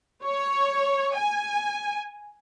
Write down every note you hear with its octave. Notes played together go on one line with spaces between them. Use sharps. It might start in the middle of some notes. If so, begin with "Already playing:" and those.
C#5
G#5